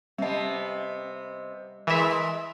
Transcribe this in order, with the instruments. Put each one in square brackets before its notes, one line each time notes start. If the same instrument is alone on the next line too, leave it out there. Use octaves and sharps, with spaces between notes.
[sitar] C3 B3 [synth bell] G3 D#5
[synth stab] E3 E5 [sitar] G#3 A#4